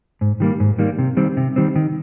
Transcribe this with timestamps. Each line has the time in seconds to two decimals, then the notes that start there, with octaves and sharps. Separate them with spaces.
0.21 G#2
0.40 D#3 G3 A#3
0.60 G#2
0.79 D#3 G3 A#3
0.99 C3
1.17 D#3 G3 C4
1.37 C3
1.56 D#3 G3 C4
1.76 D#3